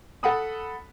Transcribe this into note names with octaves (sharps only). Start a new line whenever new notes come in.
A4 F#5 B5 D#6